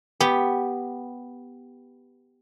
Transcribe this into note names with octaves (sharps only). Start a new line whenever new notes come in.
B3 G4